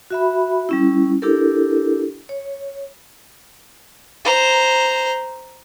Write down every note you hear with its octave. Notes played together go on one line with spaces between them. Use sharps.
F#4 E5 B5
G3 C#4 E4
D4 E4 G4 A4 A#4
C#5
C5 A#5